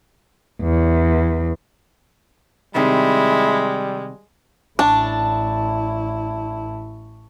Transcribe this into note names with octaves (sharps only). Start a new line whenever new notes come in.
E2
C3 D#3 G3 G#3 E4
A1 D4 E4 A5 C#6